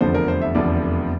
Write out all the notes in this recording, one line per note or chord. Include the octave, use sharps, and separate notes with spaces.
F1 E2 D3 F3 C5
A#4
C5
E5
F1 E2 D3 F3 D5